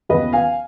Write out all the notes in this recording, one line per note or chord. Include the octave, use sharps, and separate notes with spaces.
D#2 C#3 F3 B3 B4 D#5
F5 G#5